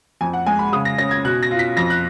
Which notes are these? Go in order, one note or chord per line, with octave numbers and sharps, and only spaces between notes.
F2 G#5
F#5
G#3 G#5
B5
C#3 D#6
A#6
C#4 A#6
G#6
B2 F#6
A#6
F4
B6
F2 A#6
F#6